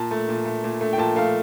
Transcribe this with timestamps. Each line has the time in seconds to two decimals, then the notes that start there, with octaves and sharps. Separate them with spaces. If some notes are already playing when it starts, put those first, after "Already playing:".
Already playing: A#2 A5
0.11 A3
0.29 A#2
0.45 A3
0.64 A#2
0.81 A3
0.93 G5
0.98 A#2 A5
1.16 A3 F5